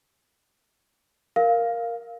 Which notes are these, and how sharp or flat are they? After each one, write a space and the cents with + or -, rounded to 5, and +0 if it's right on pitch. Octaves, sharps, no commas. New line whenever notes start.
A#4 +0 F5 +0